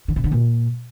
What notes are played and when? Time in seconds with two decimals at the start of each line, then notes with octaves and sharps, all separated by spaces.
0.08 D3
0.16 C3
0.24 D3
0.32 A#2